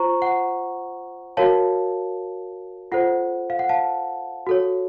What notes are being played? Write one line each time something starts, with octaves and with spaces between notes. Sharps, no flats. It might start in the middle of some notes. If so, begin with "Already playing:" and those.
Already playing: F4 C5 A#5 C#6
F#5
F#4 A#4 C#5 F5 A5
F4 A4 C5 F#5
F5
F#5
F5 A5
F#4 A4 C#5